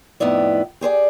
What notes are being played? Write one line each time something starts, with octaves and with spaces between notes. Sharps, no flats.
F2 A2 B3 D#4 E4 D5
G4 G#4 C5 D5